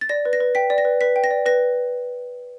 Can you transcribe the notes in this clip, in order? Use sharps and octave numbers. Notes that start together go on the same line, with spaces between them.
A6
D5 A#6
B4
A#6
B4
G5 B6
D5
A#6
B4
B4 B6
G5
A#6
D5
B4 A#6